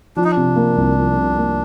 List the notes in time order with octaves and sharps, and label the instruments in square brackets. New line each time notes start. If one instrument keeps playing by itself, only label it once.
[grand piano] F3 [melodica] D4
[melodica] D#4
D4
[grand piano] C3
A#3
C2
F3
C3
A#3